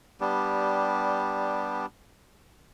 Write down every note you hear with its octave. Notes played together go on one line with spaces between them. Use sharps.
G3 B3 D4 G4